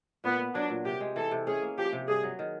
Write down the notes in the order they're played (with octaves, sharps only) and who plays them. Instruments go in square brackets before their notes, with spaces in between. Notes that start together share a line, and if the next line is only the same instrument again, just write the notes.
[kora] A#2 [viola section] B3
[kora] B3
[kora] F#3 [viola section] D4
[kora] A#2
[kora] C3 [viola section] G4
[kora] G#3
[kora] E3 [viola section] A4
[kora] C3
[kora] C#4 [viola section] G#4
[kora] A#3
[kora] F3 [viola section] G4
[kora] C3
[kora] G2 [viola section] G#4
[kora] F#3
D#3